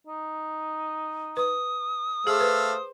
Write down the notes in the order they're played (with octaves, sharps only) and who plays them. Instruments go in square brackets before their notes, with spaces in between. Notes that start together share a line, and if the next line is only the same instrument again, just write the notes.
[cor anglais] D#4
[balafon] B4 [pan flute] D#6
[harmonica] A3 F5 E6 [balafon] G#4 [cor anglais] C5
[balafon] B4